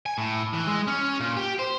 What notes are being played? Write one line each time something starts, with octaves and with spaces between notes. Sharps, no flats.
G#5
A2
E3
G#3
C#4
A#2
G4
C5